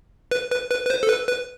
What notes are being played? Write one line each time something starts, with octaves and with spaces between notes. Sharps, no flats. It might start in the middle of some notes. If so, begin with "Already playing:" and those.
B4
B4
B4
B4
C5
A4
B4
B4